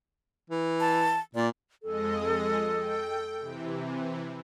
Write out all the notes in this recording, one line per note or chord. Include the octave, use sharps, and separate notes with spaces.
E3
A5
A#2 D5
F2 G#3 A4 D#5
G5
C3 E3